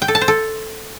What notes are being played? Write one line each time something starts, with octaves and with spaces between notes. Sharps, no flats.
G5
A4
A5
C5
A4